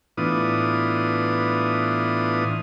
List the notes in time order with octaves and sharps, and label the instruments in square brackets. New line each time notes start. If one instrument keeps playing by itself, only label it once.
[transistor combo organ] A2 E3 B3 D4 F4 D#6